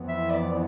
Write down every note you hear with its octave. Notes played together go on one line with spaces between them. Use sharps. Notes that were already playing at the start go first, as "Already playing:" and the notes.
Already playing: F2 E3 B3
E5
D5